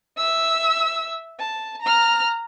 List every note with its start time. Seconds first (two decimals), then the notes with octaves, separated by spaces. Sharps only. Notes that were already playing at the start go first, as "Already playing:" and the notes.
0.18 E5 E6
1.39 A5
1.82 A#5 F6